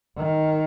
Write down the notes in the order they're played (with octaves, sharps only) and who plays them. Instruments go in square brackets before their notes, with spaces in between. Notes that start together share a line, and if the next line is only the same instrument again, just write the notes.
[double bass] D#3